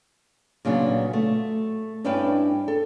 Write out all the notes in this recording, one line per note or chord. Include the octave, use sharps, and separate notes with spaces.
A#2 C#3 F#3 B3 D4
A3
G2 C#4 D4 E4 B4 G5
A4